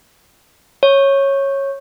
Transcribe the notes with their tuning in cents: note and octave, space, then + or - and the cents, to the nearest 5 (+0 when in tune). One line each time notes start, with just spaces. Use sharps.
C#5 -10